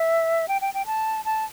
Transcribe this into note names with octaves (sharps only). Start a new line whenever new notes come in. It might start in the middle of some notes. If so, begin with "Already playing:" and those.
Already playing: E5
G5
G5
G5
A5
A5